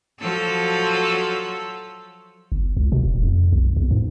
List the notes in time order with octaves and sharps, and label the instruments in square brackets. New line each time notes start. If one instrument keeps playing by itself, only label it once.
[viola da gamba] F3 F#3 A4
[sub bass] G1
C#2
B2
E1
F2
B1
E2
G#2